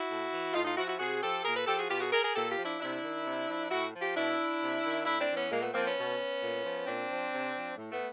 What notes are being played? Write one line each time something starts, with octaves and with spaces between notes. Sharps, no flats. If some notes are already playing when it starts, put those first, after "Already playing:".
Already playing: E4 F#4
A2
E3
A2 D#4 F4
D#4 F4
F3 E4 F#4
E4 F#4
C3 F#4 G#4
F3 G4 A4
A#2 G#4 A#4
A4 B4
F3 G4 A4
F#4 G#4
B2 F4 G4
F#4 G#4
G#4 A#4
G#4 A#4
A#2 G4 A4
F4 G4
F3
D4 E4
C3 D4 E4
D#3
C3
F3
A2 E4 F#4
F3
F4 G4
B2 D4 E4
C3
D#3
A2 D4 E4
C4 D4
E3
B3 C#4
A#2 G#3 A#3
A3 B3
F3 A#3 C4
B3 C#4
B2
A#2
F3
A#2 C4 D4
F3
C3
F3
A2
A3 B3